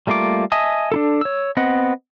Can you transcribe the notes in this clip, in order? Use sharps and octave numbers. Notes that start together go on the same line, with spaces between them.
G3 A3 A#3 F4 D6
D#5 E5 G#5 A5 D#6
D4 E4 A4
C#5 E6
B3 C4 D#5 F#5